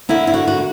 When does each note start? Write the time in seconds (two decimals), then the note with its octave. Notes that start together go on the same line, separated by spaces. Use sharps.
0.09 D3 A#3 E4
0.27 E4
0.34 F#4
0.48 F#4